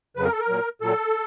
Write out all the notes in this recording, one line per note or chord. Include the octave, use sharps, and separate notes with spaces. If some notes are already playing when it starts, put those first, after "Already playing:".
F2 C#3 F#3 B4
A#4
A4
A#4
A#2 F#3
A#2 F#3 A4